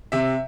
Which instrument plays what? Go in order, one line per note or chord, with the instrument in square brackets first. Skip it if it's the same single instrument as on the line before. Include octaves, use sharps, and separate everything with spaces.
[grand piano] C3 E5